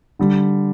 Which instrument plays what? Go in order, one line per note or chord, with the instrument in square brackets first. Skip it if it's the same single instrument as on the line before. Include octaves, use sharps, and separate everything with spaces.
[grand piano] D3 G3